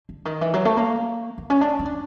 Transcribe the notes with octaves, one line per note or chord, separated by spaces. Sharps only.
D3
D#3
E3
F#3
A3
A#3
B3
C#4
D4
D#4
D4